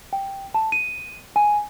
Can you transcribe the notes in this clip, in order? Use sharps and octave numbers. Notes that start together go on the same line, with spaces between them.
G5
A5
D#7
G#5